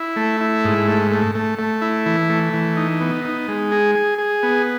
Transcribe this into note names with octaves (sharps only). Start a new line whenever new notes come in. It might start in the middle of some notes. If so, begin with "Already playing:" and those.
Already playing: E4
A3
E4
G#2
A3
A3
A3
A3
E4
E3
A3
E3
D#4
B3
D#4
G#3
G#4
G#4
G#4
B3